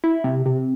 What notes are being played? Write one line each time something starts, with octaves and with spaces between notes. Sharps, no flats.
E4
C3
C3